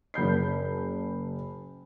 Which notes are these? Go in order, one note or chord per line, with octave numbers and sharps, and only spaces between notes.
F#1 B5 G6 C7